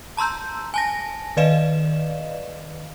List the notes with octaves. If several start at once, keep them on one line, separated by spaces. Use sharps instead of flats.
A5 A#5 C6 E6 G6
G#5 A5 A#6
D#3 B4 D5 D#5 F5 E7